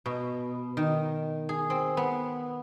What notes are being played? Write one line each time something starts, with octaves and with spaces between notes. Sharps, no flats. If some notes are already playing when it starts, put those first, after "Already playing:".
B2
D#3
G#4
C4
B3